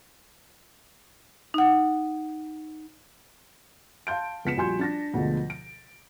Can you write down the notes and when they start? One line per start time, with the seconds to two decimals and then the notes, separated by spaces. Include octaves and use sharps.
1.54 D#4 F#5
4.07 F5 A5 C6 G6 D7
4.45 C#2 B3 B6 C#7 E7
4.57 A#1 G3 F#4 G#5 C6 G6
4.79 D4 A6 A#6
5.13 D2 B2 F3 G#3
5.50 D7